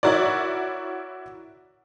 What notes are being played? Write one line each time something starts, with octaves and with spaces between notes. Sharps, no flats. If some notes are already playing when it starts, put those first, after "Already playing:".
E4 F#4 A#4 C#5 D5